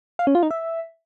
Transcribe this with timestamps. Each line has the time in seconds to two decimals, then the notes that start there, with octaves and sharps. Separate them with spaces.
0.19 F5
0.27 C#4
0.35 F4
0.43 D#4
0.51 E5